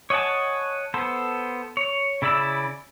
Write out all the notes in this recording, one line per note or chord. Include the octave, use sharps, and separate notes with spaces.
C#5 D#5 F#5 G#5 A5
B3 A4 C5
C#5
C#3 E4 D5 B5 E6